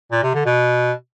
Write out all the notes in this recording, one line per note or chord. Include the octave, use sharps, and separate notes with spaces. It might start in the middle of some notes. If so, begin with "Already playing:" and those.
A#2
C3
D3
B2